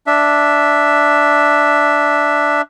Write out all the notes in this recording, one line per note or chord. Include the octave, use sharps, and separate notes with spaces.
D4 E5